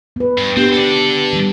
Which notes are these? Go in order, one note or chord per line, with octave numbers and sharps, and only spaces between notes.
B3 B4
G2
B3 C4 D4 G4
A4 D5
D#3 G3